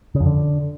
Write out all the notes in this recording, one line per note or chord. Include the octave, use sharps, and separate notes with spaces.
C#3
F2
D3